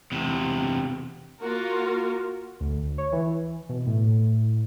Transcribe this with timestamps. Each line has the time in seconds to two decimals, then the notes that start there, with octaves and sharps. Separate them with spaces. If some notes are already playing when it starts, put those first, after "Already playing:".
0.12 E2 C3
1.39 A#3 F4 F#4 A#4
2.60 D2
2.98 C#5
3.12 E3
3.69 B2
3.86 A2